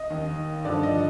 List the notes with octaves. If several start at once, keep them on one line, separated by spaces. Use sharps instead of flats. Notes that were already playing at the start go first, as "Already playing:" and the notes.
Already playing: D#5
D#2 D#3
G2 D3 F3 D5
D#5